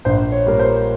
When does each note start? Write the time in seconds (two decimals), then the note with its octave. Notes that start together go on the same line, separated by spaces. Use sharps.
0.05 A#1 C5
0.32 C#5
0.46 A#2 G3 A#4
0.59 C5